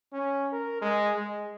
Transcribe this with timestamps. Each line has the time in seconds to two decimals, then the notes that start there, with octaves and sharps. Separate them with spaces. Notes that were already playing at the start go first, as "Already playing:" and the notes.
0.12 C#4
0.52 A#4
0.81 G#3
1.16 G#3